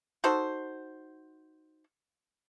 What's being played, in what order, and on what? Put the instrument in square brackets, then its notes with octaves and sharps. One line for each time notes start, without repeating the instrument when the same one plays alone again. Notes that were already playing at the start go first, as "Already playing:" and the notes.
[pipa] D#4 F#4 A4 C5